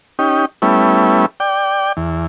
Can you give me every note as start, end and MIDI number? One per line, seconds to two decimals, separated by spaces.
0.19 0.45 61
0.19 0.45 63
0.19 0.45 67
0.62 1.26 55
0.62 1.26 57
0.62 1.26 59
0.62 1.26 61
0.62 1.26 64
1.40 1.92 74
1.40 1.92 79
1.97 2.27 40